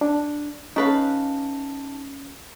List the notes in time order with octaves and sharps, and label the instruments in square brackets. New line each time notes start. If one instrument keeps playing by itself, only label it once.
[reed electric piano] D4
[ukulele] C#4 B4 F5 [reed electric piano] D#4 A5